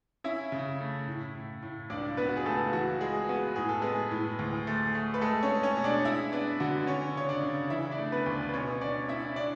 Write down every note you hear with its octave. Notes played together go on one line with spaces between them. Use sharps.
C#4 E4 E5
C#3
A3
A2
A2
A2
C#2 D4 D5
C#2 B3 B4
F#4
G#4
C#2 A3 A4
E3 F#4
G#3 G#4
B3 F#4
A2 G#4
A4
G#3 B3 G#4
A2
D2
A3
A3
B4
G#3 A3 A4
C#4 C#5
G#3
C#4 C#5
B2
D4 D5
G#3 E4 E5
B3 D4 D5
D3 F#4
C#4 C#5
C#3 C#5
D4 D5
C#3
E3 E4 E5
D4 D5
A3
B3 B4
D2
B4
B2 C#4 C#5
C#4 D4 D5
C#4 E4 E5
D4 D5